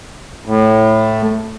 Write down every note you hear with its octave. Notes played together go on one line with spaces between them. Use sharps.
A2